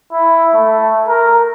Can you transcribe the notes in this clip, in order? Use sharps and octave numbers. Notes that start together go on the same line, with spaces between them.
E4
A3
A#4